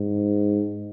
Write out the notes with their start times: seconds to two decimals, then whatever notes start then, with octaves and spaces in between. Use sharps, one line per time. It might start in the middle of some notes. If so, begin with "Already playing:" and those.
Already playing: G#2